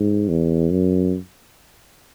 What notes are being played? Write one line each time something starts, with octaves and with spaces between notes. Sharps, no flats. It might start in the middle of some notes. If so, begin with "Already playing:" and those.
Already playing: G#2
E2
F#2